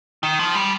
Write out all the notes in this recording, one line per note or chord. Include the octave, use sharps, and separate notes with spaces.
D#3
F3
G3